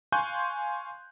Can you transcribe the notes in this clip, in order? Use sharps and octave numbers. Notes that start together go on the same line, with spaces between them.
F5 G#5 C6 C#6 F#6 G6